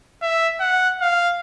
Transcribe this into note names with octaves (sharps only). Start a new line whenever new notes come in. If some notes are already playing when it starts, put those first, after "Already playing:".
E5
F#5
F5